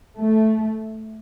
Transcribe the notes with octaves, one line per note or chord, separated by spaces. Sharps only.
A3